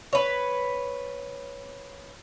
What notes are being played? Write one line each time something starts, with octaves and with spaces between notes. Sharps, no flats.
B4 C#5